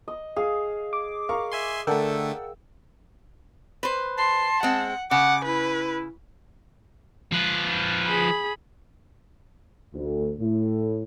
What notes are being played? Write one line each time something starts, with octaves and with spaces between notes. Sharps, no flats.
D#5
G#4 F5
D6
A#4 F5 C#6
E5 G#5 C6
D3 A3 A4 A#4 D5 F#5 G5 E6
B4 C5
A5 C6
G#3 C4 F#5
C#3 F#5 D6
E4 B4
F3 B4
G#4 B5
D2
A2